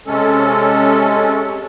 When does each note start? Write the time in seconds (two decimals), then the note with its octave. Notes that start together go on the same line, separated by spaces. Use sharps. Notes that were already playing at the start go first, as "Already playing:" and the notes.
0.07 C3 G#3 C#4 A4